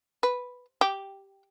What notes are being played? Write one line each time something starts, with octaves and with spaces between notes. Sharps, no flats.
B4
G4